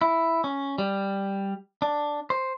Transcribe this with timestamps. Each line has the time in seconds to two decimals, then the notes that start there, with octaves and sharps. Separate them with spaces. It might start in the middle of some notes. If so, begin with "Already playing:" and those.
0.01 E4
0.44 C#4
0.78 G3
1.82 D4
2.30 C5